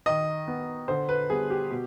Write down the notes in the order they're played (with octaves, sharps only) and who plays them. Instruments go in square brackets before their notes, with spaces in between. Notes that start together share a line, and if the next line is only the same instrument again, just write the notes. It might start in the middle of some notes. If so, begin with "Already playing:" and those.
[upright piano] D#3 D#5
B3
D3 C5
B4
G3 B3 G#4
G4
B2